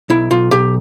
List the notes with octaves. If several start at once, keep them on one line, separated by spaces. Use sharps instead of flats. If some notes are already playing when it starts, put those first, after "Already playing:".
B1 E4
B1 F4
B1 G4